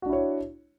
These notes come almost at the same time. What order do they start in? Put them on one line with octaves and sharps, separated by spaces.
F#4 D4 E4 C#5